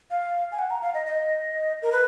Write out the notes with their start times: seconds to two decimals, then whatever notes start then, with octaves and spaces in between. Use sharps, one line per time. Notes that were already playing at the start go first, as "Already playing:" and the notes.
0.11 F5
0.52 G#5
0.59 F#5
0.70 A#5
0.82 F5
0.94 D#5
1.06 D#5
1.82 A#4
1.92 B4